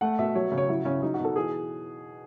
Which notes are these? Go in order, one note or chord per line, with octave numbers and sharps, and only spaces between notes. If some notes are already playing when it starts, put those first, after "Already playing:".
A3 F#5
B2 E5
F#3 C#5
C#3
C#5
F#3 E4
C#3 C#4
F#3 D#4
F#4
B2
A4
E3 G#4